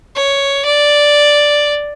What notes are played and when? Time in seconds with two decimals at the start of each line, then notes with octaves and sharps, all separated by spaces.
0.16 C#5
0.66 D5